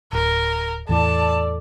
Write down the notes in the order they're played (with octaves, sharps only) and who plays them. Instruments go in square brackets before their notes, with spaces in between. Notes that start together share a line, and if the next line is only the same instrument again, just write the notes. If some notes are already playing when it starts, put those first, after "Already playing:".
[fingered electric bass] D1 [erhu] A#4
[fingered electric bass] E2 A2 E3 [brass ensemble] A4 D5 [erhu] A5